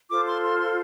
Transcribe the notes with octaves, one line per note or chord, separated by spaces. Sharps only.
F4 A4 C5 D6
C6
C6
C6